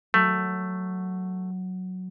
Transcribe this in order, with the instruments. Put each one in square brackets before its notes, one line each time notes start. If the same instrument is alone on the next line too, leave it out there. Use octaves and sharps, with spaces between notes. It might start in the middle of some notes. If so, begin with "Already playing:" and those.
[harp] F#3 [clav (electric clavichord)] A3